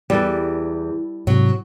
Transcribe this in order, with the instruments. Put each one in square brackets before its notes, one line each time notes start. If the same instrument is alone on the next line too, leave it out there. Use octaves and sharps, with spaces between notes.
[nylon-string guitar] E2 [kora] G3 A4 B4
[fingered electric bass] G#2 C3 [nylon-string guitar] F#3